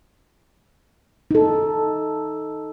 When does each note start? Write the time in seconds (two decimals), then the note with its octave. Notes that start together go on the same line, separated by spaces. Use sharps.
1.31 D#4 A4